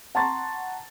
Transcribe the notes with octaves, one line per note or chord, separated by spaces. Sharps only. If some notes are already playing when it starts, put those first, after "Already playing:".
F#5 A5 A#5 C6 C#6 A6